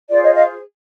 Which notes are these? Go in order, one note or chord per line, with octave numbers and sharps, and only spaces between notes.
F4 G#4 C5 D5
C#5 D#5
D#5 F5